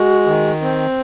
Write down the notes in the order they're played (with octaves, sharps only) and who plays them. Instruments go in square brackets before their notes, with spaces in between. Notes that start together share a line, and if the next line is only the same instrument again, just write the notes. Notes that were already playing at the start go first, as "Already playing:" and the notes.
Already playing: [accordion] G#3 [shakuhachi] F#4
[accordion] D#3
C4